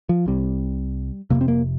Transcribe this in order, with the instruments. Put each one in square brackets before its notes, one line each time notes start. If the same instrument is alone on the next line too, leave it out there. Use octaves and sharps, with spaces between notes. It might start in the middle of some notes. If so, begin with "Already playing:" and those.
[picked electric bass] F3
C2 C3 G3
F1 F2 C3 A#3
C4
A#3